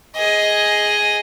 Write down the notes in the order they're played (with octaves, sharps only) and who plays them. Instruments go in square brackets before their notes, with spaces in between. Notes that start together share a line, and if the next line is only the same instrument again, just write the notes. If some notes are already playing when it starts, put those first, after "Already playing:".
[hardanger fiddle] G#4 D#5